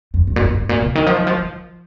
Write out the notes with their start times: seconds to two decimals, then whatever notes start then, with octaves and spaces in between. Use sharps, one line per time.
0.14 F2
0.27 G2
0.36 A#2
0.41 G2
0.54 G2
0.69 A#2
0.82 C3
0.95 D#3
1.06 F3
1.16 D#3
1.27 F3
1.37 F3